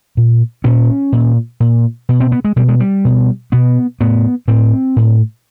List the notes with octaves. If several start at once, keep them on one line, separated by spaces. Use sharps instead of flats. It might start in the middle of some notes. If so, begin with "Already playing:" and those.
A#2
A#2 C#4
A#2
A#2
B2
C4
B3
G#3
B2 G3
G#3
G3
B2
B2 B3
A2 B3
A2 C4
A2